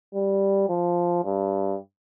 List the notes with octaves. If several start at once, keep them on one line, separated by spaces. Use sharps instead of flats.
G3
F3
G2